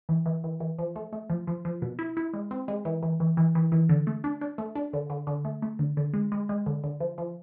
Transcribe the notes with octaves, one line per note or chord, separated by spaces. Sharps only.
E3
E3
E3
E3
F3
A3
A3
F3
F3
F3
B2
E4
E4
G#3
C4
G#3
E3
E3
E3
E3
E3
E3
D3
A3
D4
D4
A3
D4
D3
D3
D3
A3
A3
D3
D3
G#3
G#3
G#3
D3
D3
F3
F3